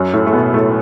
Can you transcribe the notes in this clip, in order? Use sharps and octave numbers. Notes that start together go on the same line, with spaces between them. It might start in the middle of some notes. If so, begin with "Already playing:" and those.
Already playing: F#2 F#3
A2 A3
A3
B2 B3
A2 A3